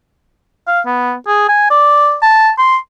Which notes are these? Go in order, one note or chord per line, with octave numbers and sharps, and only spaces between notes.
F5
B3
G#4
G#5
D5
A5
C6